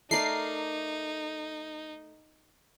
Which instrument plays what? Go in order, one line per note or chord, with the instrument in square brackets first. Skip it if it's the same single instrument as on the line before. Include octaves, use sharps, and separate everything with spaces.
[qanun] A3 A#4 D5 [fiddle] D#4 [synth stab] C7